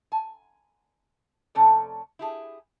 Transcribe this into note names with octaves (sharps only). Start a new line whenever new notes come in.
G#5
F2 C3 A3 C#4 A4 D5
E4 G4 G#4